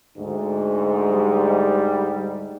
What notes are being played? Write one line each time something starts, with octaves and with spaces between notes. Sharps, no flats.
D2 G#2
G3